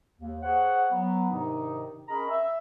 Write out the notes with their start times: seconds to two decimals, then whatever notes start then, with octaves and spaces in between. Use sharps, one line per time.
0.19 D#2
0.43 G#4 C5 C#5 F#5
0.92 F#3 B3
1.30 G#2 C3 D#3 D4 D#4
2.08 C#4 G#4 A#4 D#5 A#5 B5
2.29 E5